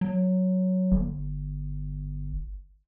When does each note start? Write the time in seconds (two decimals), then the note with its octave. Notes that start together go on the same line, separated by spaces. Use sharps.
0.01 F#3
0.92 G1